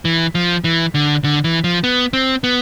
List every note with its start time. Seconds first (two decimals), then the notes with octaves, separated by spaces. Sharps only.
0.05 E3
0.35 F3
0.64 E3
0.95 D3
1.24 D3
1.44 E3
1.64 F3
1.84 B3
2.13 C4
2.44 B3